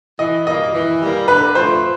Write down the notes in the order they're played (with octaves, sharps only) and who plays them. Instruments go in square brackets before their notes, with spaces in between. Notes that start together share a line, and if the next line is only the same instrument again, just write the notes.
[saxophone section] E3 [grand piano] D#5
[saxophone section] G3 A#3 [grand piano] D#5
[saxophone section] E3
G3 A#3
[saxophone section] D3 [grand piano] B4
[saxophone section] F3 A3 [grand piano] C5